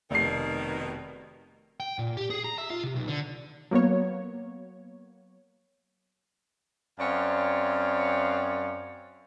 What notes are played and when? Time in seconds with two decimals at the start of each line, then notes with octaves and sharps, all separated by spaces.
0.11 F1 B2 D#3 C7
1.80 G5
1.99 A#2
2.17 G4
2.30 G#4
2.44 A#5
2.58 E5
2.70 F4
2.83 C3
2.96 B1
3.08 D3
3.71 F#3 A#3 B3 C#5
6.99 F#2 C4 C#5 D5 F5